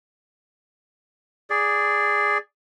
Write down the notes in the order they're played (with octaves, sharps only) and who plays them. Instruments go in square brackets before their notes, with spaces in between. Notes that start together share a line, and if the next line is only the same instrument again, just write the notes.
[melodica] G#4 D5